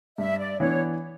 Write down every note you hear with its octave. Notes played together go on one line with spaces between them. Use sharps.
G2 E5
D5
E3 B3 D4 C#5